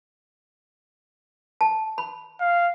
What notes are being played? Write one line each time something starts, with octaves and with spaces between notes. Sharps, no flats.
A5
B5
F5